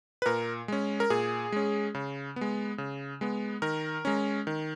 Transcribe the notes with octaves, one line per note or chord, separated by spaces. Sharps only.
B4
A#2 A#4
G#3 C#4
A#4
A#2 G#4
G#3 C#4
C#3
B3
G#3
C#3
G#3 B3
D#3 A#4
G#3 C#4
D#3